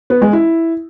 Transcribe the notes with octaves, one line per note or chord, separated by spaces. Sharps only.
B3
G#3
E4